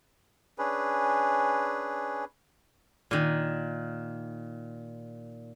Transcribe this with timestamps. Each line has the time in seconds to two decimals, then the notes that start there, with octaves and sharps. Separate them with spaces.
0.58 C#4 D4 G#4 B4
3.11 A#2 D#3